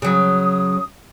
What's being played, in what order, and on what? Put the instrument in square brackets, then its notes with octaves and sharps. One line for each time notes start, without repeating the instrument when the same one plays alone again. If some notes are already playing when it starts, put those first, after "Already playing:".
[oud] C#3 F#3 [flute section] D#6